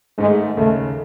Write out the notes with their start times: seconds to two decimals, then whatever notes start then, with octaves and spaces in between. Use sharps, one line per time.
0.18 G#2 D#3 G#3 A3
0.57 D#2 C#3 G#3 A3